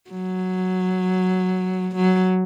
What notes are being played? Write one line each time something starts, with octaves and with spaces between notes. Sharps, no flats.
F#3
F#3